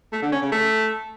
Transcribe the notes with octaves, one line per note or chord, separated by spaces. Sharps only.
A3
D3
C#4
C#3
A3